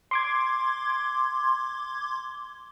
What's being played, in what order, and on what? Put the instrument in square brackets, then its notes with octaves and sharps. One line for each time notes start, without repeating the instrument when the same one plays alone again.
[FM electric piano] C6 D6 G#6